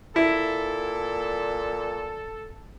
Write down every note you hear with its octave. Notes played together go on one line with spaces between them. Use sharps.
A#2 E4 A4